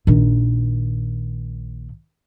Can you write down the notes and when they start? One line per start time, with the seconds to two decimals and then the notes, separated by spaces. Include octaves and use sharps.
0.07 A#1 D#3